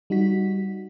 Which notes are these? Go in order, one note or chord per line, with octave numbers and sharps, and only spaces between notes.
G3 D#4 F#4 B6